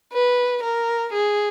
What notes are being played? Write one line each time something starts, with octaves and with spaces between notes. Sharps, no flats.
B4
A#4
G#4